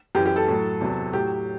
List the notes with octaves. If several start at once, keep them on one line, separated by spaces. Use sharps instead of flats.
F#2 E3 G4
G4
A4
A2 F#3
E2 C3 F#3
A2 F#3 G4